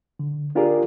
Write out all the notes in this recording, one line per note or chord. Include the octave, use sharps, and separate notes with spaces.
D3
D4 F4 G4 G#4 A#4 D5